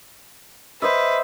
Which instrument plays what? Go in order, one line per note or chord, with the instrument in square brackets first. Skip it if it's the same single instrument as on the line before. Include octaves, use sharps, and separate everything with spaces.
[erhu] B4 [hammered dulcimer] C5 D#5 E5